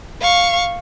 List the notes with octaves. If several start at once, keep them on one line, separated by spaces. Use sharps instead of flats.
F5 C#6